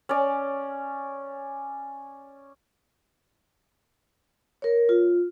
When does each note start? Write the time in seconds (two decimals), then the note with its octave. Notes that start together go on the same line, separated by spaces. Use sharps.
0.09 C#4 D5
4.62 A#4 C#5
4.89 F4